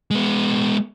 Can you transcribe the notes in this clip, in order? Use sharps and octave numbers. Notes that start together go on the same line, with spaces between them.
G#3 B3